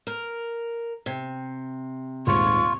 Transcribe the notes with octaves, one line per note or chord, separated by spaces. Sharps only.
A#4
C3
D#1 G#2 F4 C#6